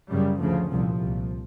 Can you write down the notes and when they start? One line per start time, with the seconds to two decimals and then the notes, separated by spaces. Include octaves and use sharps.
0.10 F#2 C#3 G3
0.40 D2 C#3 F3
0.71 C2 A#2 F3
1.01 C2 A#2